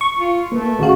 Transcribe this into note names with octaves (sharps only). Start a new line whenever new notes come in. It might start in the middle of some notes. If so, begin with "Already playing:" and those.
C#6
F4
A3 A#3 B4
G#1 C#4 F#4 G#4 F5